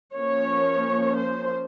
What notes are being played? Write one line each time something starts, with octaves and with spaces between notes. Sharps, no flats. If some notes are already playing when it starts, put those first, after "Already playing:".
F3 A#3 C#4 C#5
C5